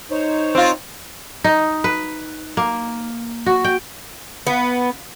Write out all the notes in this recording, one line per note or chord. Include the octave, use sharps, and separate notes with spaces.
D#4 C5 C#5
C4 F4
D#4
B4
A#3
F#4
G5
B3